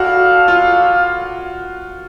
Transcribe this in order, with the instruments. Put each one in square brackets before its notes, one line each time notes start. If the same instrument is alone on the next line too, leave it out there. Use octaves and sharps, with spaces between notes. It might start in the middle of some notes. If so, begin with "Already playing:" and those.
Already playing: [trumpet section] E4 A4 D5 F5 [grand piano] F#4
[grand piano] F4